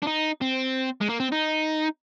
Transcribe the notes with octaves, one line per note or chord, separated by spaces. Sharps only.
D4
D#4
C4
G#3
A#3
C4
D#4